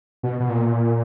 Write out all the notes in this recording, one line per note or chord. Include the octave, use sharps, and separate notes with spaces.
B2
B2
A#2